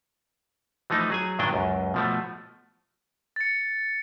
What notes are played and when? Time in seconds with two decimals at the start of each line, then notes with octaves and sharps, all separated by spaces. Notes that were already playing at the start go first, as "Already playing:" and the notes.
0.90 E3 F3 A3 D#4
1.10 F#3 G#4 G#5
1.39 G2 A#2 D#3 F#3 D4 G5
1.53 C#2 F#2
1.94 B2 F3 A3
3.36 A6 C#7